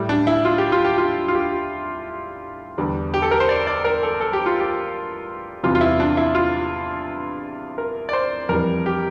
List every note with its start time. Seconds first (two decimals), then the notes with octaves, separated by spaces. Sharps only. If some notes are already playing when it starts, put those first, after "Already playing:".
Already playing: A2 G3
0.09 D4
0.27 E4
0.45 F4
0.58 G4
0.72 F4
0.84 G4
0.98 F4
1.28 F4
1.35 G4
2.78 E2 D3 G3
3.14 G4
3.22 A4
3.31 A#4
3.40 C5
3.49 D5
3.67 D5
3.84 A#4
4.03 A4
4.20 A4
4.33 G4
4.46 F4
4.60 G4
5.63 E2 C3 E3 G3 F4
5.75 F4
5.81 E4
6.00 D4
6.17 E4
6.35 F4
7.78 A#4
8.09 D5
8.13 C5
8.49 F2 E3 G3 A#4
8.86 G4